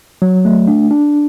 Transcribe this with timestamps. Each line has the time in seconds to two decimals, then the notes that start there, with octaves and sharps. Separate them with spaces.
0.22 F#3
0.45 A3
0.68 D4
0.91 D4